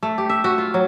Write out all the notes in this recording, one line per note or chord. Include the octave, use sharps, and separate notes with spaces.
A3
G4
E5
F#4
F4
F#3